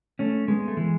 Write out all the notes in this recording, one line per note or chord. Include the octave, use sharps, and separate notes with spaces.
A3 C#4
G#3 B3
A3
E3 G#3